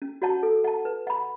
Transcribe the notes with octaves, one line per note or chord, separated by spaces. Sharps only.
C#4
F#4 C#5 F#5 A5
A4
F#5 A5
B4
F#5 B5